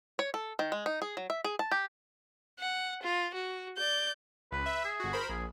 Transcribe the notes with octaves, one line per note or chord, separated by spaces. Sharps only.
C#5
A4
D#3
G#3
D#4
G#4
F#3
E5
G#4
A5
G4
F#5
F4
F#4
D5 G6
C#2 B4
E5
G#4
G1 F#4
A#4 C5 B5
A#1 G#4